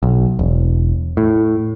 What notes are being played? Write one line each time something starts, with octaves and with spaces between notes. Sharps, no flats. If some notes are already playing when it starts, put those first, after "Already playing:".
B1
E1
A2